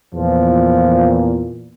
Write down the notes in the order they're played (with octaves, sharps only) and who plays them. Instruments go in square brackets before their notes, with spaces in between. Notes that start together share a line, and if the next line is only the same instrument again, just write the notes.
[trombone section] E2 A#2 [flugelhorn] F3